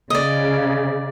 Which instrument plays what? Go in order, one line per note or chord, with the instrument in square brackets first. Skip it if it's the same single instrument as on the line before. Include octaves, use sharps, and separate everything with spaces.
[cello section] C#3 [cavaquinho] D5 D#5